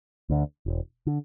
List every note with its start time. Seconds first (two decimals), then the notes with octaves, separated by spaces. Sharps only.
0.30 D2 D3
0.66 E1
1.07 D3